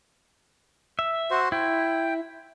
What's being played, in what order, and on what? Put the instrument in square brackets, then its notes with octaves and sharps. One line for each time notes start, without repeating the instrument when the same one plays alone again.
[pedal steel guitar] E5
[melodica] F#4 C5
[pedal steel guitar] E4 [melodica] G5